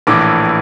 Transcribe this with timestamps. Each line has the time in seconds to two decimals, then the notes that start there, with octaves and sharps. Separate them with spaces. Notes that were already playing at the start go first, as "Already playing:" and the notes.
0.07 A#1 A2 E3 D6